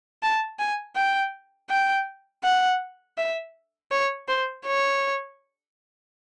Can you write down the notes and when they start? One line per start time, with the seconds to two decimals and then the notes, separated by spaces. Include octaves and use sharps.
0.23 A5
0.59 G#5
0.96 G5
1.70 G5
2.44 F#5
3.18 E5
3.92 C#5
4.28 C5
4.66 C#5